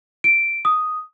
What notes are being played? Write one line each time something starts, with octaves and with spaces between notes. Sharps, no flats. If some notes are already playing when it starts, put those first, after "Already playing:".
D7
D#6